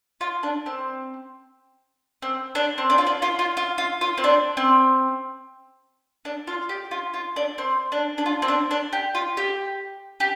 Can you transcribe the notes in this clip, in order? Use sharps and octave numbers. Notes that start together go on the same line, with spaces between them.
F4
D4
C4
C4
D4
C4
D4
F4
D4
F4
F4
F4
F4
F4
C4
D4
C4
D4
F4
G4
F4
F4
D4
C4
D4
D4
F4
C4
D4
D4
G4
F4
G4
G4